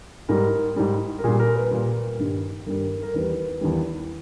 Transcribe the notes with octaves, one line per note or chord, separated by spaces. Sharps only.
G#2 G3 A#4
G#2 G3
A#4
A#2 G3 G#4
A#4
B4
A#2 G3 A#4
G2 D#3 G3
G2 D#3 G3 A#4
A#4
E2 D#3 G3 B4
E2 D#3 G3